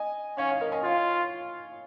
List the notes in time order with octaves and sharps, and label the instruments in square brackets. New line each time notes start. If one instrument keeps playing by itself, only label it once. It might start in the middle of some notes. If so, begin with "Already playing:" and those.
Already playing: [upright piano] D#5 G#5
[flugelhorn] C#4 [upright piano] C#5 F5
[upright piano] C#5 F5
A#4 D#5
D#5 G#5
[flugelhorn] F4 [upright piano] C#5 F5